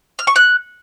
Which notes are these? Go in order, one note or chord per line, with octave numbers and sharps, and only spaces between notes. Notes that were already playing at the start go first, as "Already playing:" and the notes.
F6
C#6
F#6